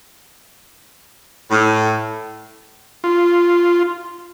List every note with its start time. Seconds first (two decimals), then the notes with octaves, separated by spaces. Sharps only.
1.51 A2
3.04 F4